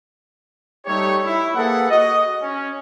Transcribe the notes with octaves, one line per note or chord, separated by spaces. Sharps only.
G3 A3 D#4 G4 C#5
E4
A#3 G#4 A4 B4 F#5
F#4 D#5
C#4